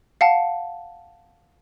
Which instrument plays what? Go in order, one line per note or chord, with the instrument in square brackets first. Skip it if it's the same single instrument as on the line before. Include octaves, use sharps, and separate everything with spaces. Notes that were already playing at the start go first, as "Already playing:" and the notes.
[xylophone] F5 F#5 A5